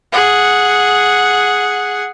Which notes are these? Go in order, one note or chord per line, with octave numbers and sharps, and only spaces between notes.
G#4 F#5